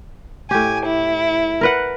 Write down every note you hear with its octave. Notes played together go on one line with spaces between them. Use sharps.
A2 G4 G#5
E4
A#4 B4 F#5